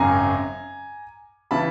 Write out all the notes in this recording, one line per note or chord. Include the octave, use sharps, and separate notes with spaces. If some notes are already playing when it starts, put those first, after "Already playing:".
Already playing: G#1 F#2 C#3 G#5 A#5
C#3 E3 A5 B5